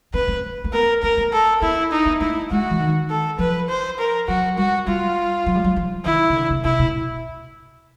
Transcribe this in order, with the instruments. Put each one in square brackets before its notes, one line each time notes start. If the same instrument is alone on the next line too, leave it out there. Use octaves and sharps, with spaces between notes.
[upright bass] C4 [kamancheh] B4
[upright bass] C4
A#3
[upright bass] B3 [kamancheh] A#4
[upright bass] C4 [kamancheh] A#4
[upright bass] B3
[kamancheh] A4
[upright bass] B3 [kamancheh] E4
[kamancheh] D#4
[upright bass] B3
[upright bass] A#3 [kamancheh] E4
[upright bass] G#3 [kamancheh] F#4
[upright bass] E3
D#3
[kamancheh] A4
[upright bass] F3 [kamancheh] B4
[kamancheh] C5
A#4
[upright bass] F#3 [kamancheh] F#4
[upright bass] G3 [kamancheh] F#4
[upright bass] G3 [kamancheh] F4
[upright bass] F#3
G3
F#3
F3
[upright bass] D#3 [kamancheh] E4
[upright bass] C#3
D3
C#3
[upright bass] C3 [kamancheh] E4
[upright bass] B2